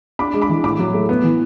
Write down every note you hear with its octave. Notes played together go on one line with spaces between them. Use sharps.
D4 B5 D6
G#3
B5 D6
E3
A2 B5 D6
F#3
A3
B3
E3